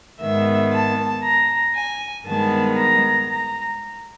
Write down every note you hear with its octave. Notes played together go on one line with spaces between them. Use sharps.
G#2 D#3 G#3 B3 E5
A5
A#5
G#5
G2 D#3 G#3 B3 A5
A#5
A#5